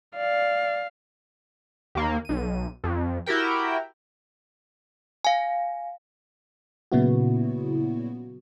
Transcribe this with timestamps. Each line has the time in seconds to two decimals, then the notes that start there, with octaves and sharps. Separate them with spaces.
0.17 D5 F5
1.95 D#2 A#3
2.25 B1 D#7
2.84 F2
3.26 E4 F#4 G4 A#4 G5
5.25 F5 G#5
6.92 A#2 C#3 F#3 B3 E4 F#4